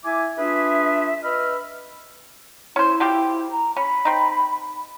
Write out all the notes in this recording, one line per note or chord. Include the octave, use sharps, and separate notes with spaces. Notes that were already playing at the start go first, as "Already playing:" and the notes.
E4 E5 G#5 D6
D4 F4 G#4 B4 E5
B4 D#5 E5 B5 F6
C#4 E4 C5
F3 C4 G4
A#5
C#4 B5
C4 D#4